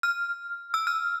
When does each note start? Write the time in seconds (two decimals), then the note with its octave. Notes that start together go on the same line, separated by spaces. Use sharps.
0.03 F6
0.74 E6
0.87 F6